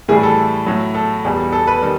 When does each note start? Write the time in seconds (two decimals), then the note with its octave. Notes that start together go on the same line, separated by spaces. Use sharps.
0.08 A2 E3 G3 G#4
0.23 A4
0.67 A2 F#3
0.95 A4
1.25 E2 B2 G3
1.53 A4
1.67 B4
1.82 D#3 G3